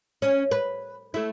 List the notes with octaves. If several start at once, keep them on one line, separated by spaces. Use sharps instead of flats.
C#4
B4
A3 E4